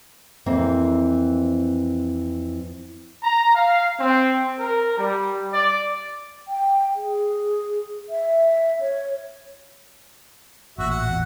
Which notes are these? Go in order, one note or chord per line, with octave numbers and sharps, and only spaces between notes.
F2 E3 A#3 C4
A#5
F5
C4
A#4
G3
D5
G5
G#4
E5
C#5
A1 A#2 F#4 E5
F#5
E2